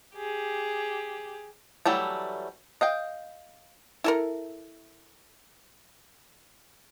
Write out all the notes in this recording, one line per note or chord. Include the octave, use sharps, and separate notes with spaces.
G4 G#4
E3 F#3 G3 A3
D#5 F5 G5
E4 A4 A#4